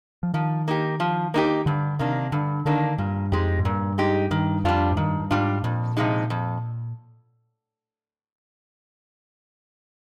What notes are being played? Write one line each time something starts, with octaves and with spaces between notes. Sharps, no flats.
F3
D#3 F3
A#3 D#4 G4
F3
A#3 D#4 G4
G2 D3
C3 D#3 A#3 D4
G2 D3
D3 D#3 A#3 D4
G2 A#2
F2 G#3 D#4 G4
G#2
G2 A#2
G#3 D#4 G4
G2 D#3
F2 G3 D4 F4
G#2
G2 D#3
G2
G#2 G3 D4 F4
F2 A#2
C3 F3 G#3 D#4
F2